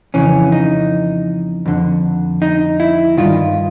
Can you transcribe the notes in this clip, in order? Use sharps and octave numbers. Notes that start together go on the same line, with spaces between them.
F2 C#3 E3 C#4
D#4
F2 D3
D#4
E4
G2 D#3 F4